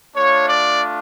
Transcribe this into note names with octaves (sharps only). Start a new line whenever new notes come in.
A3 D4 F4 C#5
D5